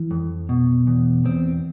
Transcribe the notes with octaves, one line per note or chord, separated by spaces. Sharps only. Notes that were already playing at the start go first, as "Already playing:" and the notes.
Already playing: E3
F2
B2
E2
E2 C4